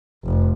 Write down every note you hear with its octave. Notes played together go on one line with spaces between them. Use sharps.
F1